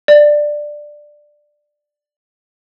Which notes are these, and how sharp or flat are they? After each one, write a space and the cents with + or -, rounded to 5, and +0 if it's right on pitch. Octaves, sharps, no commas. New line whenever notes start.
D5 +10